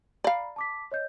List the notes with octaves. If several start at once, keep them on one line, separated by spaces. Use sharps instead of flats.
D5 F5 A#5 B5
A5 D6 B6
C#5 D#5 G6